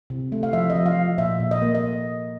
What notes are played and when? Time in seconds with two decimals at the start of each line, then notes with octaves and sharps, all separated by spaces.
0.10 C3
0.32 A3
0.43 F5
0.53 F3 E5
0.70 D#5
0.76 F3
0.86 F5
0.97 F3
1.18 A#2 E5
1.40 A#2
1.51 D#5
1.62 A#3
1.75 D#5